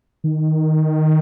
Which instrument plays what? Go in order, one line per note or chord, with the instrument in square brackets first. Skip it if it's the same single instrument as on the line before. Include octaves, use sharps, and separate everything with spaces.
[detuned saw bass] D#3